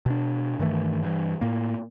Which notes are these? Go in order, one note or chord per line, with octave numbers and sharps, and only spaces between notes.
B2 D4
G2 D#3 E3 A3
G2 E3
A2 A#3